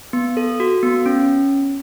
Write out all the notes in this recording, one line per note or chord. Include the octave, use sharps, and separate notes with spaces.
B3
A4
F#4
B3
C#4